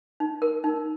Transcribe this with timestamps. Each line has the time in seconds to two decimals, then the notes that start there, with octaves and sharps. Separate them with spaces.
0.20 D#4
0.42 A#4
0.64 D#4